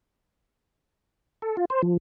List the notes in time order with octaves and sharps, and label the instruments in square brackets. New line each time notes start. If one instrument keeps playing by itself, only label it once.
[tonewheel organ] A4
F4
C5
F3